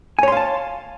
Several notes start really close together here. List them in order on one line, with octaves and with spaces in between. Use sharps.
G#5 C#5 C6 F5 A5